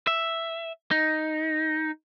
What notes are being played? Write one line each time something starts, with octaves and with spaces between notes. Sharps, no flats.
E5
D#4